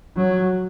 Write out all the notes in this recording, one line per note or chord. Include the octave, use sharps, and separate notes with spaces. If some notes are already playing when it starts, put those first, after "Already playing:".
F#3